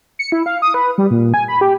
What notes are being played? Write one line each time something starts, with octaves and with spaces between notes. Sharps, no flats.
C#7
E4
F5
D#6
B4
G3
A#2
G#5
B5
G4